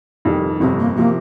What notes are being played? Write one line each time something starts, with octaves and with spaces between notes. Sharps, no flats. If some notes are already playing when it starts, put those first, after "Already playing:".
F1 F2 D#3 G3
G1 F2 C3 C4
A#3
C3 F3 A#3